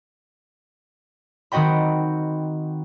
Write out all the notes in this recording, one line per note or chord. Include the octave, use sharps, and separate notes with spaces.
D#3 C4 F#4 D#5 G5 B5